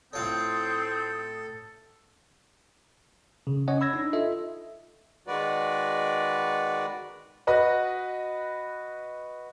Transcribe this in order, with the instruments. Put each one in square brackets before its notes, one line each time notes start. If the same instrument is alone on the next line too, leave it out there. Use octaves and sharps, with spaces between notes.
[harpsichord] A2 F4 C#5 [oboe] C4 [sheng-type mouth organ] A4 [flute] D#6
[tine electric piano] C#3
C#4 C#5 D#5 F#5
B5 E6 G#6 A#6
D4 D#4
F4 A4 D#5 E5
[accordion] D#3 G#3 F#4 B4 D5
[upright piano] F#4 B4 D#5 F#6